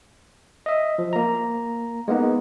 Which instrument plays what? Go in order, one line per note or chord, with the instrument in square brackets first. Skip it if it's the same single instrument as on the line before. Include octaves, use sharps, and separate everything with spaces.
[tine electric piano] D#5 E5
F3
A#3 A#5
G#3 A#3 B3 D#4